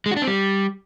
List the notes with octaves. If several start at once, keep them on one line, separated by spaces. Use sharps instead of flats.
G#3
F#4
D4
C4
G3